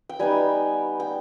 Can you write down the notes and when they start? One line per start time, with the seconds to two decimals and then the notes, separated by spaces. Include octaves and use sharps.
0.09 G5
0.19 G3 B3 D#4 G#5
1.00 G5